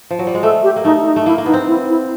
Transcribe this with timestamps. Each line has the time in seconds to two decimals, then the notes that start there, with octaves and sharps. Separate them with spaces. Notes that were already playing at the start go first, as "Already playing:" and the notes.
0.10 F3
0.19 F#3
0.27 G3
0.34 G#3
0.43 A3 A4
0.63 G4
0.76 A#3
0.85 A3 D#4
1.05 D#4
1.16 A3
1.26 A#3 E4
1.38 A#3
1.46 B3 D#4
1.54 C4
1.68 E4
1.89 E4